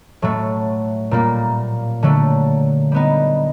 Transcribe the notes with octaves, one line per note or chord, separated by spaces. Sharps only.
A2 F#3 A3
A#2 G3 A#3
D3 F#3 A3
G3 B3 D#4